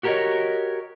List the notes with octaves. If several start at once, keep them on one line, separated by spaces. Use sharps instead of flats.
F#4 G4 A#4 C5 C#5 D#5